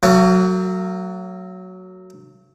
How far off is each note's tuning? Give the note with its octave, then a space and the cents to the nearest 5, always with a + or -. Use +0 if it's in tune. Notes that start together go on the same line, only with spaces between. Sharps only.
F#3 +0 A3 +45